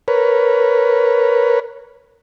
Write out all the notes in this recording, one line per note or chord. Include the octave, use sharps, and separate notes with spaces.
A#4 B4 C#5